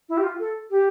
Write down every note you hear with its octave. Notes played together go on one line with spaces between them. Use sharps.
E4
G4
F4
A4
G4